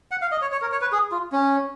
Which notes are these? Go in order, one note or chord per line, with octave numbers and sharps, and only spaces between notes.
F#5
F5
D#5
C#5
C#5
A#4
C#5
B4
G#4
F4
C#4